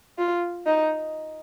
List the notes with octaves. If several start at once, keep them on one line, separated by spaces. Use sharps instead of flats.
F4
D#4